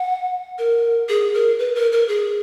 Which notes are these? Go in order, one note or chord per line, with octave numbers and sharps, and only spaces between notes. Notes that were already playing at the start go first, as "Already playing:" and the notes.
Already playing: F#5
A#4
G#4
A#4
B4
A#4
A#4
G#4